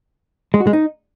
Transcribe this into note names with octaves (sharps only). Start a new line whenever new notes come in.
G#3
F#4
G#3
D#4